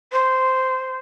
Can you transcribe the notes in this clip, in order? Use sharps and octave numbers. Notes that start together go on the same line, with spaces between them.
C5